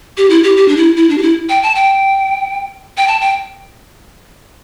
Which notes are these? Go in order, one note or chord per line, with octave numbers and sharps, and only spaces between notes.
G4
E4
G4
G4
D4
E4
E4
D4
G4
E4
G5
A5
G5
G5
A5
G5